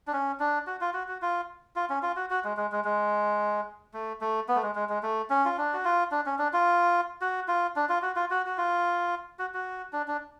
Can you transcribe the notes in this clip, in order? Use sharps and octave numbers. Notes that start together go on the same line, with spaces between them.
D4
C#4
D4
F#4
F4
F#4
F#4
F4
F4
C#4
F4
F#4
F#4
G#3
G#3
G#3
G#3
A3
A3
B3
A3
G#3
G#3
G#3
A3
C#4
F4
D4
F#4
F4
D4
C#4
D4
F4
F#4
F4
D4
F4
F#4
F4
F#4
F#4
F4
F#4
F#4
D4
D4